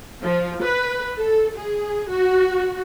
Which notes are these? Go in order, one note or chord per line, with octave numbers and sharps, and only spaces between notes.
F3
B4
A4
G#4
F#4